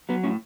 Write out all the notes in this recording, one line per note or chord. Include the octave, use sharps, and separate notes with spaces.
F#3 B3
A2 C#4